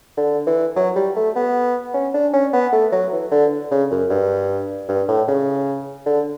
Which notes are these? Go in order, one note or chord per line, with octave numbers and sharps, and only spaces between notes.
D3
E3
F#3
G3
A3
B3
C#4
D4
C#4
B3
A3
F#3
E3
D3
C#3
F#2
G2
G2
A2
C#3
D3